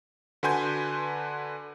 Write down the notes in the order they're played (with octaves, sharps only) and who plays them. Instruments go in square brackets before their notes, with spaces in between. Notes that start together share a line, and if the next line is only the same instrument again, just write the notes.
[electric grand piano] D3 F#4 B4 G#5 C6 G6